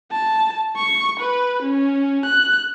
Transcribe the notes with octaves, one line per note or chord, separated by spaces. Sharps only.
A5
C#6
B4
C#4
F#6